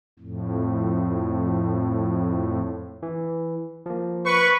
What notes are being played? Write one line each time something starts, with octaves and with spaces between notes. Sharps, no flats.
F2 A2
E3
F3 A#3
B4 C#6